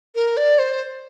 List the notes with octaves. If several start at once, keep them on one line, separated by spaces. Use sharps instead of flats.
A#4
D5
C5